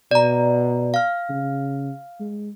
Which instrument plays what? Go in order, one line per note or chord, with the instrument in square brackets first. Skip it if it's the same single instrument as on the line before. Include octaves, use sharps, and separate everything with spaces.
[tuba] B2 [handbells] D5 A#5
[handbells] F5 F6
[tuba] C#3
G#3